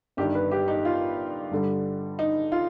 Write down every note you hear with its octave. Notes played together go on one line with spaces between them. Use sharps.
G1 G2 D#3 G4
B4
G4
D#4
F4
G2 D3 G3
D#4
F4